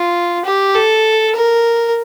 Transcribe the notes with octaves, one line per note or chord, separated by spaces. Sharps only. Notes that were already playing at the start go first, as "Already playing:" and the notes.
Already playing: F4
G4
A4
A#4